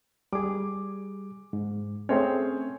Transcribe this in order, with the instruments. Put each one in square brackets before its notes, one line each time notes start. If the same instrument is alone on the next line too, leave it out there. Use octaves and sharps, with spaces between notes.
[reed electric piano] G3 G#4 [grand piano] D6
[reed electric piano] G#2
[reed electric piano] A3 C4 C#4 [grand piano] G#4 C5 C#5